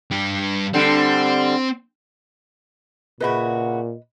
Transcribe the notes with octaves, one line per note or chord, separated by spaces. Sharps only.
G2 G4
D3 G3 C4
A#2 C#3 E4 F#4 B4 D#5 B5